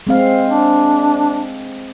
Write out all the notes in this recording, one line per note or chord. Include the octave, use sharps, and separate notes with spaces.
G#3 C4 F5
D4